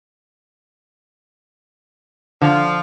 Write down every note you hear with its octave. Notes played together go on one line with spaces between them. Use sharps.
D3 F3 F5